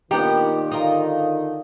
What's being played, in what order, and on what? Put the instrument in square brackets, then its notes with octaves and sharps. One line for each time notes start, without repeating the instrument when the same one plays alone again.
[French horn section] A#2 D#3 [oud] B3 D4 D#4 [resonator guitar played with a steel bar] G4
[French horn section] D3 D#3 [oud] D#4 F4 A#4